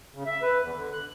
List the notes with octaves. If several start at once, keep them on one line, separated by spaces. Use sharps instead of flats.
C#3
E5
B4
E2
D3
F#6